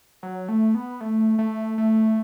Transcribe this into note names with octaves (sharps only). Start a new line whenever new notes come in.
F#3
A3
B3
A3
A3
A3